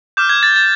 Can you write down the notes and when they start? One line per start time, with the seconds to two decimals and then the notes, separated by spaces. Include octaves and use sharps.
0.17 D6 F6 G6
0.29 G#6
0.43 A6
0.56 A6